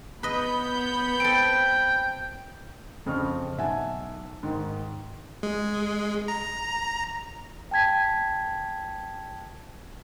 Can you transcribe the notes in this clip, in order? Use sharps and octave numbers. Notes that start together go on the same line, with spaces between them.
B3 B4 D#5 B5 G6
C4 A4 G5 D7
F2 C#3 C4 D4 C#6 F6
B1 D#4 E5 F#5 G#5 A5
G#2 D#3 G#3
G#3
A#5
G5 A5 G#6 B6